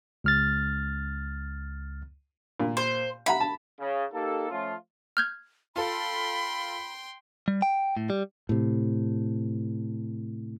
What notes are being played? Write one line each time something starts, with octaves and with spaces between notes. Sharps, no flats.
C#2 F6 A6
A#2
C5
E5 F#5 A#5 B5
A5
C#3
A#3 D#4 G4 A4
F3 A3 C#4 F4
F6 G6 G#6
F4 A4 G5 B5 C6
G3
G5
A2
G3
A2 C3